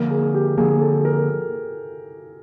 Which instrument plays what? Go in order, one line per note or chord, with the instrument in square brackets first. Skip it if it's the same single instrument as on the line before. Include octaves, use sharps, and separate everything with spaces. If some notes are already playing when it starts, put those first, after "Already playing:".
Already playing: [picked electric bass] D3 F3 A#3 [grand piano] A#4
[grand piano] G#4
G4
[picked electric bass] D3 F3 A#3 [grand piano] G#4
[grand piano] A4
A#4